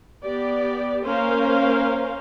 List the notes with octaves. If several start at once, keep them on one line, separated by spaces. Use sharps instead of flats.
B3 G4 D5
A#3 C#4 A#4 C5 F5